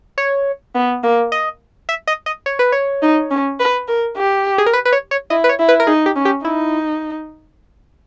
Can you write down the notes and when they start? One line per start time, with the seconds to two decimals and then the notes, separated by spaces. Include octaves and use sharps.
0.18 C#5
0.75 B3
1.04 A#3
1.32 D#5
1.89 E5
2.07 D#5
2.26 D#5
2.46 C#5
2.59 B4
2.72 C#5
3.02 D#4
3.31 C#4
3.60 B4
3.88 A#4
4.17 G4
4.58 G#4
4.66 A#4
4.73 B4
4.85 B4
4.92 C#5
5.11 C#5
5.30 E4 D#5
5.44 B4
5.49 C#5
5.59 E4
5.69 B4
5.80 A#4
5.87 D#4 G#4
6.06 G4
6.16 C#4
6.25 G4
6.45 D#4 E4